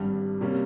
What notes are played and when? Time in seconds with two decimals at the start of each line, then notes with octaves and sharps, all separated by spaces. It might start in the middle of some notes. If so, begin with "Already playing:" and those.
Already playing: G#1 G2 G3
0.41 C3 G3 A#3 C#4